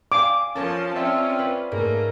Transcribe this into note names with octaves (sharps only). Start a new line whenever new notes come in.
F5 G#5 D6
F3 C#4 F4 A4 A#4 C#5 A5
C4 C#4 F4 D5 E5
B4
G#2 A3 A#3 A#4